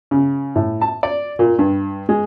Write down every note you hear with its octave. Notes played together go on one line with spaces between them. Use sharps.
C#3
A2
A5
D5
A#2
G2
G#3